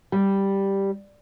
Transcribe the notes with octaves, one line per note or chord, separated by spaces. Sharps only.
G3